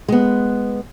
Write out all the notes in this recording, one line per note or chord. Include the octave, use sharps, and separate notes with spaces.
G#3 B3